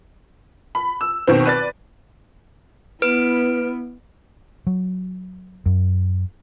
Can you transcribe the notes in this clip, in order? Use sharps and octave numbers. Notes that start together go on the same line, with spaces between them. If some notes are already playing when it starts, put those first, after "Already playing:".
B5
E6
B2 D#3 C4
B4 D5 A6
B3 E4 B4 F6 D7
F#3
F#2